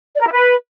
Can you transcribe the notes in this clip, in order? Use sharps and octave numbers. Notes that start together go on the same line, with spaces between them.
D5
A#4
E4
B4